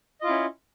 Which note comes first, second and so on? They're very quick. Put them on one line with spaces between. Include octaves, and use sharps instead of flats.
D#5 F4 E4 C#4